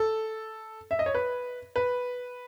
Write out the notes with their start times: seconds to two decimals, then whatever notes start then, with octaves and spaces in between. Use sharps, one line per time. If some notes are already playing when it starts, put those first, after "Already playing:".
Already playing: A4
0.91 E5
0.99 D#5
1.06 C#5
1.14 B4
1.76 B4